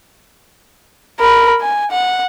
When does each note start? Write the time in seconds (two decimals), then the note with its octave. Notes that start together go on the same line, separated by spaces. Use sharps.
1.20 A#4 B5
1.61 G#5
1.91 F#5